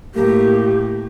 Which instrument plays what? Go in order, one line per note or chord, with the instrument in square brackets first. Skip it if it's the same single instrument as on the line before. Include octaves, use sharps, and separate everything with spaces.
[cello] A2 [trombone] A#3 [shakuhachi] G4